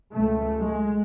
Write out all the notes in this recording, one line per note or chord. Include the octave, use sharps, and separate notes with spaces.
C#2 A3
G#3